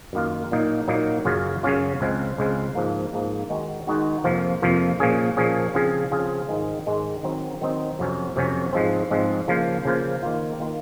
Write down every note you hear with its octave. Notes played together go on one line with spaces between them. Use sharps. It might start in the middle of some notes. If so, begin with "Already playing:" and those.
F#2 D#3 A#3 F4
A#2 F#3 A#3 D#4
A#2 F#3 A#3 D#4
F#2 C#3 F#3 C#4 F4
F#2 C#3 F#3 C#4 F4
C#2 C#3 G#3 C4 F4
C#2 C#3 G#3 C4 F4
G#2 F3 A#3
G#2 F3 A#3
D#3 G#3 D#4 F#4
D#3 G#3 D#4 F#4
F2 C3 F3 A#3 F4
F2 C3 F3 A#3 F4
A#2 F3 A#3 C#4 G#4
A#2 F3 A#3 C#4 G#4
C#3 F3 C4 F4 G#4
C#3 F3 C4 F4 G#4
G#2 D#3 G#3
G#2 D#3 G#3
D#3 F#3 C4 D#4
D#3 F#3 C4 D#4
F2 C3 F#3 C#4
F2 C3 F#3 C#4
G#2 F3 G#3 C4
G#2 F3 G#3 C4
C#3 F3 A#3 F4 C5
C#3 F3 A#3 F4 C5
D#3 A#3 F4
D#3 A#3 F4